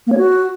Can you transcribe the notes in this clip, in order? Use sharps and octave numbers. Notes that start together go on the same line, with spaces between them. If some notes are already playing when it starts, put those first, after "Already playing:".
A#3
C#5
F#4